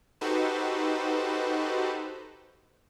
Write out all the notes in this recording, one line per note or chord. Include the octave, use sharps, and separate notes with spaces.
D#4 F#4 G4 A4 B4 C5